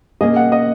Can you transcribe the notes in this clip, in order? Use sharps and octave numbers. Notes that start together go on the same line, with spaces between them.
B2 A#3 C#4 G#4 D#5
F#5
D#5